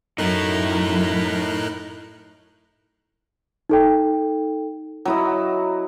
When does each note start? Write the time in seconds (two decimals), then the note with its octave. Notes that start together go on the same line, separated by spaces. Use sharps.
0.18 F#2 A2 D#4 E4 A#4 F#6
3.69 D#4 A4 G5
5.05 F#3 E4 D#5